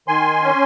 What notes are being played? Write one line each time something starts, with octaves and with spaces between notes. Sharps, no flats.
D#3 G#5 C6
C#4